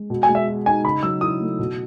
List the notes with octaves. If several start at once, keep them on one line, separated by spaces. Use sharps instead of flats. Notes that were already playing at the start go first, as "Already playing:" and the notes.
Already playing: G#3
B2
G#5
G#3
E5
F#4
D#4 G#5
C#3 B5
F#3 E6
E4 D#6
A3
B2